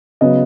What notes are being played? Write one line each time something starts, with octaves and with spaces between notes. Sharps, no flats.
C#3 F#3 B3 D#5